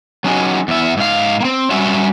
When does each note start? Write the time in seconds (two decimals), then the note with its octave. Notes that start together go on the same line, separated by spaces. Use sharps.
0.24 F#3 C#4 D#4 F#4 G#4
0.68 E2 E5
0.97 G#2 F5
1.40 A#3 C4
1.71 G3 C#4 F#4 E5